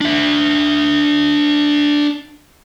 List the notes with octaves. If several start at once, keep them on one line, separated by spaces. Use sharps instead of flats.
D4 E5